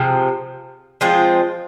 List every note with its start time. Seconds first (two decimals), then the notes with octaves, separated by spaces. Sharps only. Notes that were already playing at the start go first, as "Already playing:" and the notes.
Already playing: C3 F3 G#3
1.01 F3 G#3 C4 F4